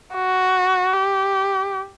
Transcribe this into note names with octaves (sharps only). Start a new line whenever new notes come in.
F#4
G4